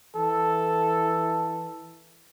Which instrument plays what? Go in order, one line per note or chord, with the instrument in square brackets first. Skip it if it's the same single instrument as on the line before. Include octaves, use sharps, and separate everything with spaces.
[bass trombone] E3 [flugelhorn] A4